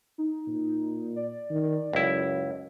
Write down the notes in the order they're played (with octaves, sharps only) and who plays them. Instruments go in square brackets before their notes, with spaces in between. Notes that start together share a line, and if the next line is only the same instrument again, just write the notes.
[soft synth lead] D#4
[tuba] A#2
[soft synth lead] D5
[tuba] D#3
[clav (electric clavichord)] C#2 E4 [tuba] F#2